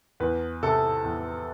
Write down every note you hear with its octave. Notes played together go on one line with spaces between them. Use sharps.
E2 B4
C3 A4
E2